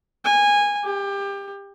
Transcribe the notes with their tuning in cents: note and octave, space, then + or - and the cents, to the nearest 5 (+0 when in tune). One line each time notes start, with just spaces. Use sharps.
G#5 -15
G4 +25